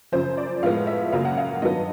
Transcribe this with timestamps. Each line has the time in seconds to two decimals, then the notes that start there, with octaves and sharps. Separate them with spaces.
0.12 F#2 C#3 F3 C5
0.37 D5
0.62 A2 F3 G#3 B3 F5
0.87 E5
1.12 F#2 C#3 F#3 A#3 F5
1.25 F#5
1.38 F5
1.62 G2 D#3 F#3 B3 D#5